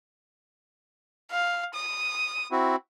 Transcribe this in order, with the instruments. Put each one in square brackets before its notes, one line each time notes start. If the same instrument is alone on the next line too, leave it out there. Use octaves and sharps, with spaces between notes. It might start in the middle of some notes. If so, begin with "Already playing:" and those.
[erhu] F5
D#6
[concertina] C4 E4 F#4